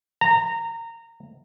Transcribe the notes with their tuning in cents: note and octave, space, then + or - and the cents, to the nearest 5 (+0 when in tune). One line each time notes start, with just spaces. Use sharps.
A#5 -20